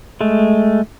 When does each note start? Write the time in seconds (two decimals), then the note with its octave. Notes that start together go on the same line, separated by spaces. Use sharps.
0.21 G#3 A3